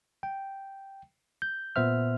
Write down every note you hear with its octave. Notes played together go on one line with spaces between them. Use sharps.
G5
G6
A#2 B3 C5 E5 F6